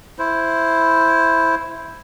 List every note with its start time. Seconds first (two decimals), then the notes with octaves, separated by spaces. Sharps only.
0.19 E4 C5